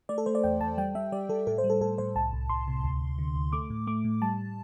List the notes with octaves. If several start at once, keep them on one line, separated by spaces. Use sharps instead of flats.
A3 D5
A4
A3 C5
D5
E2 G5
E2 A5
G3 G5
G3 E5
G3 D5
G3 A4
A2 A4
C5
G3
A4
A2 A4
A2 C5
C2 A5
C2
C2 C6
C3
D2
D2
D3
D2
A3 D6
A2
A3 D6
A2
G3 A5